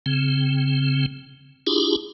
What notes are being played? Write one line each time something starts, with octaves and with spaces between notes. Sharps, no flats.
C#3 C4
D4 E4 F4 G4 G#4